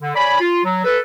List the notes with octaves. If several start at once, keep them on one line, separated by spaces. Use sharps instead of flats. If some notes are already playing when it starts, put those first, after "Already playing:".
D3
C#5 D5 G#5 B5
F4
F#3
A4 B4